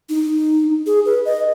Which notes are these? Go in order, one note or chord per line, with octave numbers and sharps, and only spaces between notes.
D#4
G#4
B4
D#5